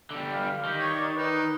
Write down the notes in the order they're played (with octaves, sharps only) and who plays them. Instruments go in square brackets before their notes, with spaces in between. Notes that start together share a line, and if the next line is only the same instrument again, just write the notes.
[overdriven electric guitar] D3 G3
[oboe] F5
[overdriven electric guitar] D#3 [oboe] G4
[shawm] C#5
[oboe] D5
[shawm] D#4 [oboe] B4